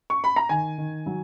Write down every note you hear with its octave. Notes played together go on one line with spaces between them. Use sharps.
C#6
B5
A#5
D#3 G#5
D#3
F#3